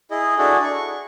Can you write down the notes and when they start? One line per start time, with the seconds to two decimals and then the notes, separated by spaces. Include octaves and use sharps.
0.11 E4 G#4 D#5
0.38 D4 E4 F#4 G#4 A4
0.64 C#6